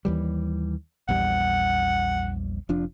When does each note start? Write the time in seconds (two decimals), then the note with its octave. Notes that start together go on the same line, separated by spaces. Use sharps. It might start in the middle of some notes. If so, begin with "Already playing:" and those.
0.05 D#2 E3 G3
1.09 A#1 E2 G3 F#5
2.69 F1 F3 D4